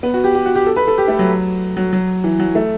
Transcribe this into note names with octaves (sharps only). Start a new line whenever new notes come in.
B3
F#4
G4
G4
F#4
G4
A4
B4
A4
G4
A3
F#3
F#3
F#3
E3
F#3
A3